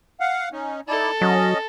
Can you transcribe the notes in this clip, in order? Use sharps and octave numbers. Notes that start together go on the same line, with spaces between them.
F5 F#5
C#4 D#4
D#4 E4 A4 D5
F#3 C#4 D#5